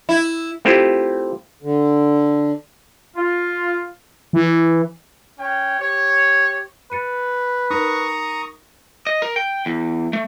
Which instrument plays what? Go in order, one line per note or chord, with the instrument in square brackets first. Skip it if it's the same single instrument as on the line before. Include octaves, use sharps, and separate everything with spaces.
[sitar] E4
[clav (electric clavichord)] A3 C4 E4 F4 G4
[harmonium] D3
[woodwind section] F4
[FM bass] E3
[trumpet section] C#4 C#5 G5
G4 C#5
[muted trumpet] B4 [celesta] A6 C#7 D#7
[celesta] D#4 A#4 [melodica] A#5 C#6 D#6
[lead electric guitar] D#5
A#4
G5
E2
A3